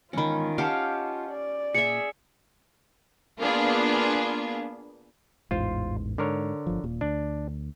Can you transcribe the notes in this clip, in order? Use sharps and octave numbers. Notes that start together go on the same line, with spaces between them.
E2 G#2 D#3 C#4 F4 B5
C#4 G4 D#5 F5 F#5 A5
D5
A#2 G#4 E5 C#7
A#3 B3 D4 F4 G#4
A1 E2 G#2 F4 C5
G#2 D3 A#4 C#5
G1 F3
D#1 A#2
D2 D4